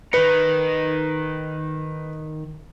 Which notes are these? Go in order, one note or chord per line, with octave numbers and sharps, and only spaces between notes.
D#3 D#4 B4 C#7